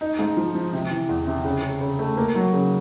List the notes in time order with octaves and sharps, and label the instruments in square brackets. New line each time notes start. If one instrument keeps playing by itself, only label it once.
[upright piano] D#4
G#2
F3
F3
C3
E3
E2
C3
C#3
C#3
C#3
A3
A#3
F#3
C#3